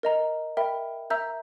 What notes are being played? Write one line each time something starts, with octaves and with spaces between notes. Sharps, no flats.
A#4 D#5 A#5
A#4 E5 G5 B5
A#4 E5 A#5 E6 G6